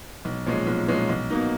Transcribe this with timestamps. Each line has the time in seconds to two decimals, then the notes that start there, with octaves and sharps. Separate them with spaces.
0.25 B1
0.46 A#2 F3 G#3 C#4
0.67 B1
0.88 A#2 F3 G#3 C#4
1.09 B1
1.30 B2 A#3 D#4